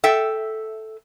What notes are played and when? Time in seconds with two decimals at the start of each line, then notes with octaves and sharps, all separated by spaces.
0.04 A4 E5 G5